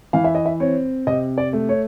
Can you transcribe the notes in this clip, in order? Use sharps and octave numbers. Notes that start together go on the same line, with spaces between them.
E3 F5
E5
D#5
E5
C4 C#5
C3 D#5
D5
A3
C#5